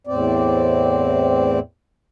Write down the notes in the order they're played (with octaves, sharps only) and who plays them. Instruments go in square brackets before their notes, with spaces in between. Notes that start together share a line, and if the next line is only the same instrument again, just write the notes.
[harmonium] E2 A2 C4 D5